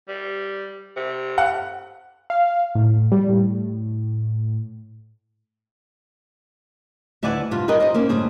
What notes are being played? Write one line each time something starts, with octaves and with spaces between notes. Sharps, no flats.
G3
C3
F#5
F5
A2
G3
A2
D2 E4 B4 D5 F#5 G#5
G2 C3 F4
G4 G#4 A#4 B4 D#5
D#4 C5 D#5
A#3 C4 C#4
D2 G2 G3 G#4 C5